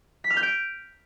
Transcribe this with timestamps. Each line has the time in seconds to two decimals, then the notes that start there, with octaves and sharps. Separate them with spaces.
0.24 B6
0.30 F6
0.37 G6
0.43 D7